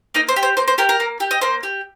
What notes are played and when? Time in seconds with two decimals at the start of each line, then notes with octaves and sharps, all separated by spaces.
0.14 A#3 D#4 D#5
0.29 C5
0.36 G4
0.43 C5
0.57 A#3 C5
0.68 C5
0.78 G4 A#4
0.89 A#4
1.00 A#3
1.20 G4
1.31 D#5
1.41 A#3 C5
1.63 G4